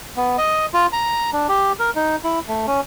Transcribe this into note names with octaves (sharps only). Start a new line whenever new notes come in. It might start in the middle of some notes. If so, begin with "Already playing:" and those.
B3
D#5
F4
A#5
D4
G4
A#4
D#4
E4
A3
C#4